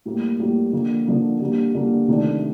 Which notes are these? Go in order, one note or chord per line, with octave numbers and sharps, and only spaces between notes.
A2 G3 A#3
A2 G3 A#3
D3 F3 A#3
D3 F3 A#3
D3 G3 A#3
D3 G3 A#3
C3 D#3 A3 D4